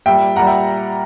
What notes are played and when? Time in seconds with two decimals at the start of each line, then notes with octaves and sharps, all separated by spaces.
0.06 A#2 G3 E5 G5
0.36 A#2 G3 F#5 A#5
0.47 E5 G5